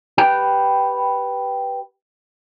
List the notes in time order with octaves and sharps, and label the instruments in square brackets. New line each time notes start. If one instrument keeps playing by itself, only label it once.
[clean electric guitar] G4 B4 G5